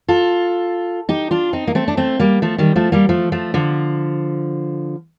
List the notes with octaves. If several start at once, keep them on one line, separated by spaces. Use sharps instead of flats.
F4 A4
D#4 G4
D4 F4
C4 D#4
A#3
A3 C4
D4
A3 C4
G3 A#3
F3 A3
D#3 G3
F3 A3
G3 A#3
F3 A3
F3 A3
D3 F3